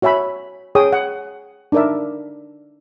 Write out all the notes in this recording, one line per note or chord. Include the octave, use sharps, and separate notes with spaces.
F#4 C#5 E5 G#5 B5
G#4 C#5 G5 D#6
F#5
D4 D#4 A#4 D5 E5